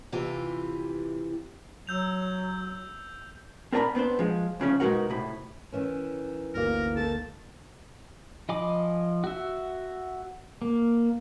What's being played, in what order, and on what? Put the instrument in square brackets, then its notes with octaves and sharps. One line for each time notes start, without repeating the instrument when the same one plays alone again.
[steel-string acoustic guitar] C3 E3 F4 G4
[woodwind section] F#3 [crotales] E6 G6 F7
[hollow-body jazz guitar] C4 A#4 D5 G#5 A#5 B5
B3 C4 D4 C5
F3 G#3
C2 C#3 F3 C#4
B2 G#3 D#4 F#4 A#4 F#5
A2 C3 B5
[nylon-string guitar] D#3 E3 C#4
[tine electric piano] G1 D2 A#3 [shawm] A#4
[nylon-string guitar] D#3 A4 [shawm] A5
[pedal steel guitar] F3 D#5 G#5 B5 D6
F#4 E5
A#3